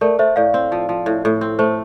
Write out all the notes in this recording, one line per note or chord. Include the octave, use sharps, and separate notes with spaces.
A3 A#4 D5
A3 C5 E5
A2 D5 F5
C4
F3
F3
A2
A2
C4
A3 C5